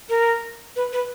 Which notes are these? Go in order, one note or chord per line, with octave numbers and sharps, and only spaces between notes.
A#4
B4
B4